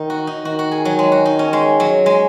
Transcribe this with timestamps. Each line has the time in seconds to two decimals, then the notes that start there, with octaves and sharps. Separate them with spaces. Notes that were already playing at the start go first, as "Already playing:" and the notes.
Already playing: D#3 D#4
0.10 F#4
0.27 D#4
0.45 D#3 F#4
0.59 F#4
0.71 G#4
0.85 F#3
0.99 G#3
1.12 F#4
1.26 D#4
1.39 C#4
1.53 G#3
1.80 F#3
2.06 G#3